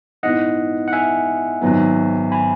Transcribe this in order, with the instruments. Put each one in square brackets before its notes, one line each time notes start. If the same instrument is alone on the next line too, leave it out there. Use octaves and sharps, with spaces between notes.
[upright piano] G#2 E3 B3 [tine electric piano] D#5 F#5
[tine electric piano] F#5
E5 G#5
[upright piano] G#1 G#2 F#3 B3
[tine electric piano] G#5 B5